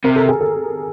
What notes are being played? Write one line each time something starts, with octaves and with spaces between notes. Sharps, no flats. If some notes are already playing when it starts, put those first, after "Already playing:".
C3 A#4
A4
G#4
A4